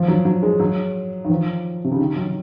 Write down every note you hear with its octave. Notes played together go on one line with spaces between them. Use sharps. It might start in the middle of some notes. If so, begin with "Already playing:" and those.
Already playing: F3
F#3
F#3
G#3
F#3
D#3
F3
C3
C#3
D#3
F#3